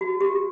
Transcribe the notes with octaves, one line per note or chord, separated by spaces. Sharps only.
F#4
G4